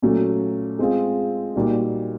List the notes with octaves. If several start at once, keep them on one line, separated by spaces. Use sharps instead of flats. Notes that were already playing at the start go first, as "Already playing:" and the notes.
A#2 F#3 A3 C#4 F#4
G#3 C4 F4 G#4
A#2 G3 A#3 D#4 F#4